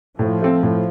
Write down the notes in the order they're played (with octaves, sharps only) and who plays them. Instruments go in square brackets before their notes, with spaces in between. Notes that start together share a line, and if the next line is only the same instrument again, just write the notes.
[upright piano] A2 [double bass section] F3
[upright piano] A3 C4
A2